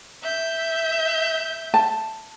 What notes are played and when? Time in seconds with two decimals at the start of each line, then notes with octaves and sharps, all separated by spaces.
0.23 E5 G6
1.74 A5